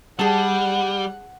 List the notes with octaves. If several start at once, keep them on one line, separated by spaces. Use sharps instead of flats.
G3 G#4 F#5 A5